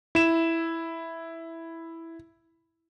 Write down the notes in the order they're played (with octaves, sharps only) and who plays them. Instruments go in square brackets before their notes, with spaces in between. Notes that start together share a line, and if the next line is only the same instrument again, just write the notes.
[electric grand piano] E4 E7